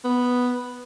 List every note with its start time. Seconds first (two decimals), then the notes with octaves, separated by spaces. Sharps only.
0.04 B3